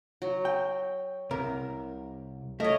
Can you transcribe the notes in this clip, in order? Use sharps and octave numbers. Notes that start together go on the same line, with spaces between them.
F#3
G5
C2 C3 A#4
A3 A#4 C#5 D#5